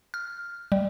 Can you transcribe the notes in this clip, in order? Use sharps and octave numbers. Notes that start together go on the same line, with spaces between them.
F6
G3